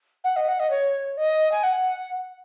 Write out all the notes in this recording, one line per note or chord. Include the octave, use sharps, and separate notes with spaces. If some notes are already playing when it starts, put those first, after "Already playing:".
F#5
D#5
F#5
D#5
C#5
D#5
G#5
F#5